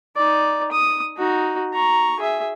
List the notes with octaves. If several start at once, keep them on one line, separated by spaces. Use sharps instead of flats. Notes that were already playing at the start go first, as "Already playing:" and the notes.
D#4 D5
D#6
D#4 F#4
A#5 C#6
G#4 E5